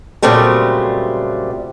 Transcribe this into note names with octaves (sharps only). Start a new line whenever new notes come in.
A#2 C#3 F#3 G3 A3 C4